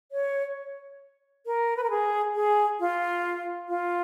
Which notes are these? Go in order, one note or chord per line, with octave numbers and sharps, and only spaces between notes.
C#5
A#4
B4
A#4
G#4
G#4
F4
F4